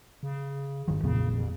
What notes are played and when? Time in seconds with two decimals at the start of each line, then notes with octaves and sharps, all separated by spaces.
0.23 C#3
0.88 G1 D#3 F#3
1.04 F2 A#2 C#3 B3
1.31 A1